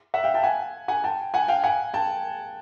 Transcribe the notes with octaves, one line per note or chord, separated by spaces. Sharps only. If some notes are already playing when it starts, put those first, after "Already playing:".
E5 F#5
F5 G5
G5 A5
F#5 G#5
F#5 G#5
G5 A5
F#5 G#5
F5 G5
F#5 G#5
G5 A5